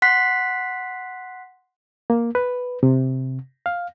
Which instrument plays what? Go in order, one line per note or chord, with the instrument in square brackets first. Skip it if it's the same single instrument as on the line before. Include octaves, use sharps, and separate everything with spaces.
[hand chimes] F#5 C6 F#6 B6 C7
[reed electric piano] A#3
B4
C3
F5